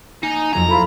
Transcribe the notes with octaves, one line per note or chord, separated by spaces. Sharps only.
A#3 D#4 G#5
F2 F#3 G#4 A#5
E4 F4 A4 C5 B5